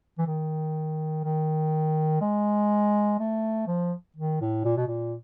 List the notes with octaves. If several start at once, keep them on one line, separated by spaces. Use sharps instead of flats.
E3
D#3
D#3
G#3
A3
F3
D#3
A2
A#2
B2
A#2